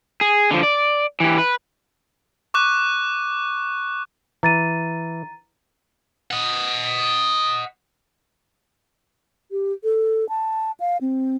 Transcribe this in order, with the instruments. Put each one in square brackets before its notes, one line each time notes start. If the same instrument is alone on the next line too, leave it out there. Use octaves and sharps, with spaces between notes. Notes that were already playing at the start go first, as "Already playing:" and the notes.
[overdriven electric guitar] G#4
D3 F3
D5
E3 G4
B4
[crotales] C#6 D6 F#6
[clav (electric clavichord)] E3 [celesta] A#5 A6 D#7
[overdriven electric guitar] D#5 F#5
[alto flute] G4
A4
A5
F5
C4